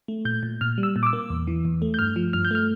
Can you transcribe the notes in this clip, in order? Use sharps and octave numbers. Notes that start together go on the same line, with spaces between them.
A3
A#2 G6
A#2
A#2 F6
G3
E6
A#2
D6
E6
A#3
E2
E3
E2
A3
G6
G2 F6
F3
G2 F6
G6
A3 F6